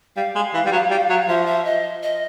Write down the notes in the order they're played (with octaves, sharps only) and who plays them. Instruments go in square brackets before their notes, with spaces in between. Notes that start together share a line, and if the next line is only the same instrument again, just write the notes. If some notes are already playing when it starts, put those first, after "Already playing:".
[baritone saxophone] G3 [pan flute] F5
[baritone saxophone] G#3
E3
G3
F#3
G3
F#3
[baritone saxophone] F3 [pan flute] E5
[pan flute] E5
D#5
D#5